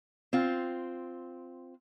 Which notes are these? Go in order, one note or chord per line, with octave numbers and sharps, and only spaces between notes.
C4 F4